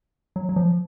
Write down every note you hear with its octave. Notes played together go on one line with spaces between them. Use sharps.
F#3
F#3
F3